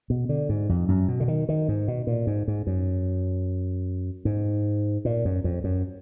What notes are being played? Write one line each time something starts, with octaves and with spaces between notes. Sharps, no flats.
B2
D3
G#2
F2
F#2
B2
D3
D#3
D#3
G#2
B2
A#2
G#2
G#2
F#2
G#2
A#2
F#2
F2
F#2